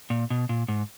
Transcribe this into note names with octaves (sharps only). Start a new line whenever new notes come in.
A#2
B2
A#2
G#2